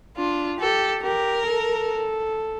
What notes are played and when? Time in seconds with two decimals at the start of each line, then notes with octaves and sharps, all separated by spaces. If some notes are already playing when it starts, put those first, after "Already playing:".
0.17 D4 F4
0.60 G4 A4
1.03 G4 A#4
1.46 A4